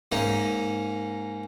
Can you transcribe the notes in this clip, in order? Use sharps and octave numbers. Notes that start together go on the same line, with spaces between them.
G#2 A#3 C#4 D#4